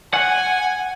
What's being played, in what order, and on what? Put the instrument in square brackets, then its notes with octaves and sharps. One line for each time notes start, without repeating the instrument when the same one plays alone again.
[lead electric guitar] F#5 [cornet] G#5